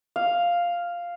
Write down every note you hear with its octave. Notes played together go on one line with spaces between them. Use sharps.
F5